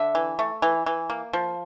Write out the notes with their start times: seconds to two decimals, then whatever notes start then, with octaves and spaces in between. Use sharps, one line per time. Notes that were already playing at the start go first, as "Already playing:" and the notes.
Already playing: D3 E5
0.15 E3
0.39 A3
0.62 E3
0.86 E3
1.10 A#3
1.33 F3